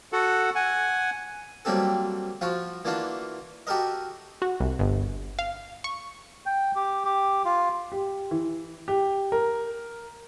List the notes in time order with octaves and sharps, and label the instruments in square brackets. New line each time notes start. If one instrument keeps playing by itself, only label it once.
[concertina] F#4 A4 F#5
F#5 G#5
[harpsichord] F#3 G3 A#3 C4 G4 A4
F3 F4 F#4
E3 A#3 D4 F4 F#4
F#4 G4 A4 A#4 D#5
[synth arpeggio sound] F#4
C2
G1
F5
C#6
[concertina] G5
G4
G4
F4
[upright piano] G4
E3
G4
A#4